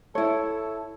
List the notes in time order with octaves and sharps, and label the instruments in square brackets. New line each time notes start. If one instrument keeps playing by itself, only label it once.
[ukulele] E4 C#5 [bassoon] A4